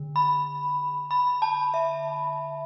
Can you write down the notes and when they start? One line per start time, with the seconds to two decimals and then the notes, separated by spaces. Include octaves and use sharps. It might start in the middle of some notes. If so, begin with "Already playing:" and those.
Already playing: D3
0.16 B5
1.11 B5
1.42 A5
1.74 E5